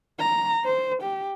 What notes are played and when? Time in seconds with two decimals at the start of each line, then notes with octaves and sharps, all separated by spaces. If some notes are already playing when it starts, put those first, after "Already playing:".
0.19 A#5
0.65 C5
1.02 G4